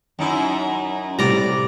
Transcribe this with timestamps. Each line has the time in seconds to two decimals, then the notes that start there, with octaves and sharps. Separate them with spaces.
0.19 F#2 D#4 E4
1.19 A2 C3 G3 D5 A#5